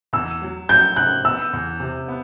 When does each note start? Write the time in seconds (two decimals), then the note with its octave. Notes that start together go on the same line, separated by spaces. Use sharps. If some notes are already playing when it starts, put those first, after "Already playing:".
0.13 E2 E6
0.42 F#3
0.69 F#3 G6
0.96 C3 F#6
1.25 B3 E6
1.53 E2
1.80 C3
2.08 B3